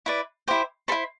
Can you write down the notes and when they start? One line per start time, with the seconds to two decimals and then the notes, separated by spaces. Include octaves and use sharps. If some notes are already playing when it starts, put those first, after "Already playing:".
0.06 E4 B4 D5
0.48 E4 G4 C5
0.88 A4 C5 B5
0.92 E4